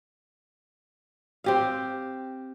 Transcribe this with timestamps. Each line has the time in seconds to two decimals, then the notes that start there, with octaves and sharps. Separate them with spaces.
1.44 C4 G4 F5